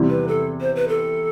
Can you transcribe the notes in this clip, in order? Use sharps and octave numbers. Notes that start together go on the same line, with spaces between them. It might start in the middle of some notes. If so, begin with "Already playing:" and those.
Already playing: E2 C3 G3 C4 E4
B4
A4
C5
B4
A4